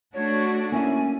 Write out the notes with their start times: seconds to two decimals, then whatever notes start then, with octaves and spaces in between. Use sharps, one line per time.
0.14 A3 D4 F#4 C#5
0.72 A#3 C#4 E4 G#5